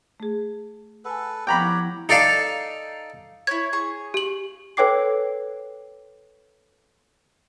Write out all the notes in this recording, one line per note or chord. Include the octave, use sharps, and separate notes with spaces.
A3 G#4
A4 B4 F#5 G#5
F3 B3 G4 C#5 F#5 G5 A#5 B5
E4
D#4 A4 D5 F5 A5
E4 C#5 G#6
G#4 C#6
G4 F#7
A4 B4 C#5 G5 D6 C7